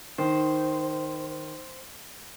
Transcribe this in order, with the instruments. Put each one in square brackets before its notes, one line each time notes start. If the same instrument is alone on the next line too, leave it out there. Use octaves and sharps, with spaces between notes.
[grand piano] D#3 [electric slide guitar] C5